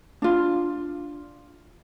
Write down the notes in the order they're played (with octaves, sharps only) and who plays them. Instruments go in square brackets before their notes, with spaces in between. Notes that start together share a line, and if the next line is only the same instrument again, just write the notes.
[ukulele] D4 F4